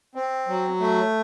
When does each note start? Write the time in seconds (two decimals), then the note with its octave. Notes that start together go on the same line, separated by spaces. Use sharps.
0.15 C4
0.48 F#3
0.80 A3